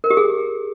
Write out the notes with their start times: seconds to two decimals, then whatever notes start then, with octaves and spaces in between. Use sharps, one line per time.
0.04 A#4
0.10 G4
0.17 G#4